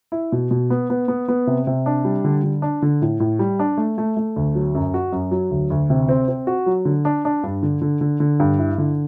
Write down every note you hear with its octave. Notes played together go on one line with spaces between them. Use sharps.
E4
B2
B2
B3
B3
B3
B3
C3
C3
D4
G3
D3
D3
D4
D3
A2
A2
G3
D4
A3
A3
A3
D2
F#3
F#2
F#4
F#2
F#3
D2
D2
C3
C4
C4
F#4
F#3
D3
D4
D4
G2
D3
D3
D3
D3
G2
E4
D3